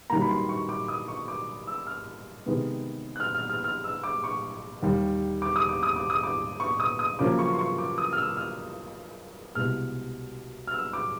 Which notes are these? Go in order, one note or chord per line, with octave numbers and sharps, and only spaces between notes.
F#2 D#3 G3 A#3 A#5
B5
C6
C#6
D6
D#6
C#6
D6
E6
F6
C3 D#3 G#3 B3
F#6
F6
F6
F6
F6
E6
D6
C#6
D#2 D#3 G3
D6
D#6
D6
D#6
D6
D#6
D6
C#6
D#6
D#6
F#2 C#3 F3 A#3 C#4 D6
C#6
C6
C#6
D6
D#6
F6
E6
F6
C2 B2 G#3 F6
F6
E6
D6